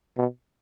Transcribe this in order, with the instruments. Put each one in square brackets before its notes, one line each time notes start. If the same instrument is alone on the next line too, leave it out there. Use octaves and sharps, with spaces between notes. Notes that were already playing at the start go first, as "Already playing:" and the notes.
[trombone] B2